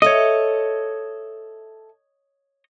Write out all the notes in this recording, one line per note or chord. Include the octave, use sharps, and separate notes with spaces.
A4 C#5 D#5 E5